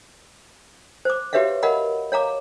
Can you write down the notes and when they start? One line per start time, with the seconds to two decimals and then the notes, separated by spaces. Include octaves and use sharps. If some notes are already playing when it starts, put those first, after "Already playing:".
1.05 C5 D6
1.33 F#4 G4 B4 C#5 E5 F5
1.63 A#4 D#5 F5 F#5 B5
2.12 C#5 F5 A#5 D6